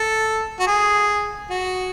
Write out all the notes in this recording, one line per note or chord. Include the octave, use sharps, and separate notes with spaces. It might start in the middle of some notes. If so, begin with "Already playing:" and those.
Already playing: A4
F#4
G#4
F#4